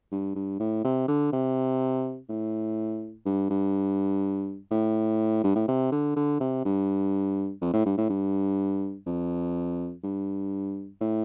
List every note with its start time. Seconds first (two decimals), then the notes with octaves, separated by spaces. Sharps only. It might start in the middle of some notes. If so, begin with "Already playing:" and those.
0.12 G2
0.35 G2
0.60 A2
0.84 C3
1.08 D3
1.32 C3
2.29 A2
3.26 G2
3.50 G2
4.71 A2
5.44 G2
5.56 A2
5.68 C3
5.92 D3
6.16 D3
6.40 C3
6.65 G2
7.61 F2
7.74 A2
7.85 G2
7.98 A2
8.10 G2
9.06 F2
10.04 G2
11.00 A2